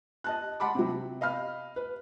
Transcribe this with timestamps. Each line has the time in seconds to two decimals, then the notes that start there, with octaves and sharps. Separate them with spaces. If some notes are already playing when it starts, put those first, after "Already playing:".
0.24 D#5 A5 F#6
0.60 F#5 A5 B5 C6 D6
0.75 C3 F#3
0.88 C3
1.21 D#5 F5 B5 F6
1.76 B4